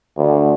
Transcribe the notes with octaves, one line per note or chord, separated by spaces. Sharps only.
D2